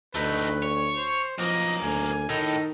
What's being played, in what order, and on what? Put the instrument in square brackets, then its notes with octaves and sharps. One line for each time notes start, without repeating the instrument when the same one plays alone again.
[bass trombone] D2 [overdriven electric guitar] A3 D#4 [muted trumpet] B4
[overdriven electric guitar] C#5
[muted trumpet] C5
[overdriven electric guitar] B1 A#3 [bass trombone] F3 [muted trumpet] D#5
[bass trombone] D2 [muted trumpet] G#5
[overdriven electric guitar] A2 [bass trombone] D#3 [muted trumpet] D#4